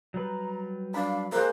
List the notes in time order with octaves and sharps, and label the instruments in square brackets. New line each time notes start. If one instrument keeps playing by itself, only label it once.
[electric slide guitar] F#3 G3 B4 [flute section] A#5
[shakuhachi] D4 [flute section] F5 [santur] B5
[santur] G#3 A#3 [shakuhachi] C5 [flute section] A#5 F#6